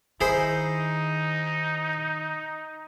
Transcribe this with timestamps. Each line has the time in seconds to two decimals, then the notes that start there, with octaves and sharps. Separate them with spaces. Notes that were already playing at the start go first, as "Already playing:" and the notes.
0.21 D#3 D#4 E4 G#4 C5